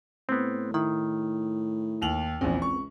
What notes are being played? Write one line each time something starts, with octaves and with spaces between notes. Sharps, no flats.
A2 B3 C4
D#3 E4
D#2 F7 F#7
A#1 E2 C#3 C4
C#2 C#6